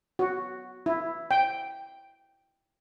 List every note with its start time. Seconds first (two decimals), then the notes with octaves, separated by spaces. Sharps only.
0.19 F#4
0.86 E4
1.31 G5